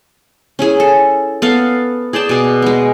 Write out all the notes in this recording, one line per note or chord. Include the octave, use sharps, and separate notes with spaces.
C#4 E4 G#4
A4
B3 A4 F5
G#4 D5 G5 A5
B2 G#4
G#3 B3